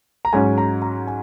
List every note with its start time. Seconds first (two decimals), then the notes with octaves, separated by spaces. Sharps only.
0.25 A#5
0.33 G#2 F#3 C#4 G#5
0.58 A#5
0.82 A#5
1.07 G#5